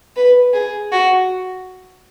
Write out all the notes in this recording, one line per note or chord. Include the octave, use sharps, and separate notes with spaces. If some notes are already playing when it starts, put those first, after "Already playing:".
B4
G#4
F#4